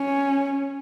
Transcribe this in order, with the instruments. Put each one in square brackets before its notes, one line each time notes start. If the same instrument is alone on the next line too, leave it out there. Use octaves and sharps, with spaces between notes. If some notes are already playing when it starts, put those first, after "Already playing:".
Already playing: [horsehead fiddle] C#4